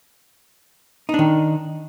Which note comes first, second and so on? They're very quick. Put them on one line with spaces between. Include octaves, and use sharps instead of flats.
D#4 D4 D#3